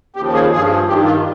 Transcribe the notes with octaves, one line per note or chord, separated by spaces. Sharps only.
D#2 C#3 F3 G4
G#4
G2 F3 G#4
G2 D#3 G4
F4